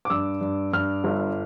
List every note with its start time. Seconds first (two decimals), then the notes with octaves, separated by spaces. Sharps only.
0.05 D6
0.10 G2 E6
0.41 G2
0.73 G2 F6
1.04 G1